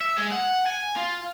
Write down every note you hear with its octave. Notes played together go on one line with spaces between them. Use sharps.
E5
G#3 G#4
F#5
G#5
F4